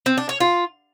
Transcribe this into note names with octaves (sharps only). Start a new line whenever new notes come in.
C4
D4
C#5
F4